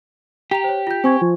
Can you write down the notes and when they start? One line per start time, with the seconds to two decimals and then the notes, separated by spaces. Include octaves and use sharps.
0.51 G4 G5 A#5 F7
0.64 C5 C#5
0.87 F4 G6
1.04 C4 G#5 C#6 G#6
1.21 F3